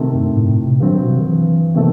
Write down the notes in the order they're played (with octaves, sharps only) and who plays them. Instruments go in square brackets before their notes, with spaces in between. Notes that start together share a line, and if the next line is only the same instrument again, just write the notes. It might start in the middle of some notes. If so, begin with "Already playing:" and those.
Already playing: [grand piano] C3 D#3 A3 C4
[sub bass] F#2
G2
A2
A2
C3
[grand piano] G2 F#3 C4 [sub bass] D#3
[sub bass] B2
C3
D#3
E3
[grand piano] C3 D#3 A3